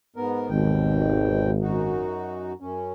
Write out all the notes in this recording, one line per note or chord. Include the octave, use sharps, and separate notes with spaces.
G#2 B3 A#4
G#1 D#2 B2 G5
F#2 D#4 F#4
F#2 C#4